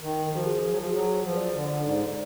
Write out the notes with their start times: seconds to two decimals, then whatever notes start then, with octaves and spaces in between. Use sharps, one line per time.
0.02 D#3 A#4
0.32 F3 F#4
0.46 G#4
0.62 F3
0.70 F#3
0.77 F3
0.86 F#4
0.92 F#3 G#4
1.22 F3
1.32 B4
1.37 D5
1.53 D3
1.83 G#2 D5